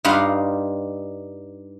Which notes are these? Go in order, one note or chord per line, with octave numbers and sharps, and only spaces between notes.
G2 G3 D#4 F4 F5 F#5